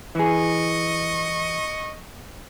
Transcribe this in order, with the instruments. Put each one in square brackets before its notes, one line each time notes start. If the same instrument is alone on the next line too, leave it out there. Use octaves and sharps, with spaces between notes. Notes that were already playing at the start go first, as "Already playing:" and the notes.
[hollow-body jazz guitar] E3 G#4 [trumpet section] D#5 C#6